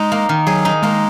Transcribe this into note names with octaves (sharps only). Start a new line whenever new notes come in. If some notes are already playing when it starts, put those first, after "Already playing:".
Already playing: G#3 D#4
A#3
D#3
F#3 G#4
D#4
G#3 A#3